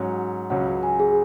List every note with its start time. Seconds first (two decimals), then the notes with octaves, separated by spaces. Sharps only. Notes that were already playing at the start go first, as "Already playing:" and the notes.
Already playing: G#2 F#3 C#4
0.16 F#5
0.50 C#2 C#3 F#3 C#4 F#5
0.83 G#5
1.00 G#4